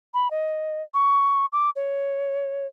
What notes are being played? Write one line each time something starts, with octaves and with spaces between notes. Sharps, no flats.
B5
D#5
C#6
D6
C#5